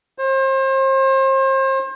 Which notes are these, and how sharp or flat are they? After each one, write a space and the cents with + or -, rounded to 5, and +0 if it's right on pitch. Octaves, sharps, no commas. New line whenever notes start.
C5 +35